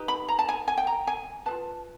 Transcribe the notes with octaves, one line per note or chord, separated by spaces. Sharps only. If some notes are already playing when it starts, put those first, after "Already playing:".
Already playing: D#4 G4 B4
B5
A#5
A5
G#5
G#5
G5
A#5
G#5
F4 G#4 B4 A5